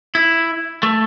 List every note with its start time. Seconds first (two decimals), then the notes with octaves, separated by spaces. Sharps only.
0.15 E4
0.83 A3